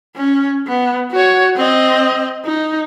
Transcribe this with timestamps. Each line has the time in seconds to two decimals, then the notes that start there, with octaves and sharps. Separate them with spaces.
0.16 C#4
0.67 B3
1.12 F#4 C#5
1.56 C4 D#5
2.45 D#4